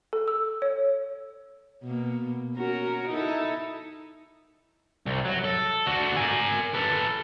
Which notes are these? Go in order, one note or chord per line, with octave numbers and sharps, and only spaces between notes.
A4
E6
C#5
B2 A#3
C#4 F#4 A#4
D#4 E4 A4
C2
F#3
A4
D3 F#4
A#4 G#5
A4 B4